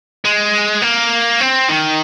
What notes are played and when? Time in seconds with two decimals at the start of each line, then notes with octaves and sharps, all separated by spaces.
0.25 G#3
0.82 A#3
1.41 C4
1.69 D#3